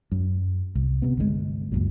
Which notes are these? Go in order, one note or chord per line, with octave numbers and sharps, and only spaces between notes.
F#2
C2
C3 B3
G1 D2 D3 G#3
C#2 F#2 A#2